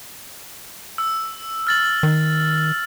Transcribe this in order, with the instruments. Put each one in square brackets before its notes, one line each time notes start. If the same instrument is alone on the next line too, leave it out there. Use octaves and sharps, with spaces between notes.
[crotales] E6
F6 A6 F#7
[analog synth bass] D#3